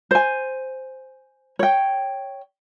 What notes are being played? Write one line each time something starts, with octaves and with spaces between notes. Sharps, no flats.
C5 G#5
C#5 G5